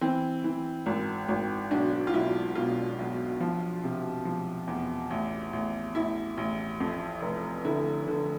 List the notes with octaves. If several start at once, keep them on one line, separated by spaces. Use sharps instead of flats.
E3 C4
E3
G#1
G#1
B1 D4
F4
B1 E4
B2 F4
B1
F3
C3
F3
E2
A1
A1
A1 E4
A1
F2
F1
D3 E4
D3